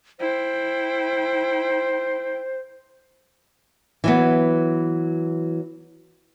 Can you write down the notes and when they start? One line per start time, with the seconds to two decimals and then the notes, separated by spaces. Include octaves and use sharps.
0.19 E4 C5 G5
4.04 E3 F#3 B3